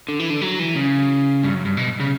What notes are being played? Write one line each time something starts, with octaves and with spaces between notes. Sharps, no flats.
D3
E3
D3
F#3
E3
C#3
G2
F#2
G2
B2
C#3